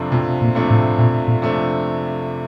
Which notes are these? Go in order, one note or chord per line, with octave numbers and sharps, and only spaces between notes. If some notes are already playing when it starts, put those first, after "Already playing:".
Already playing: F2 C3 F3 A3 D4
F2 B2
A#2
C3 F3 A3 D4
A2
F2 A#2
A#2
C3 F3 A3 D4